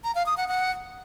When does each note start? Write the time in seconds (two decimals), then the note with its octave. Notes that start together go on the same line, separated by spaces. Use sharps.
0.04 A#5
0.15 F5
0.26 D#6
0.37 F#5
0.48 F#5